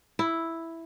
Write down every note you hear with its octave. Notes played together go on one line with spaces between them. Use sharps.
E4